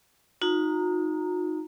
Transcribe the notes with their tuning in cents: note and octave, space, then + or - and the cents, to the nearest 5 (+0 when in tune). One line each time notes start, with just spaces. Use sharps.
D#4 +0 F#4 -45 A#5 -15